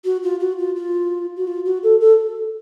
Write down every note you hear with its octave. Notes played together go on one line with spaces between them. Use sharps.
F#4
F4
F#4
F4
F4
F#4
F4
F#4
A4
A4